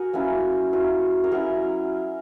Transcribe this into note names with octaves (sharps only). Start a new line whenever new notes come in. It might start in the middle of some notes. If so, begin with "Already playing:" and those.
Already playing: F#4 G#4 A#4
F#3 A#3 C#4 E4
F#3 C#4 E4
A#4
F#3 C#4 E4 G#4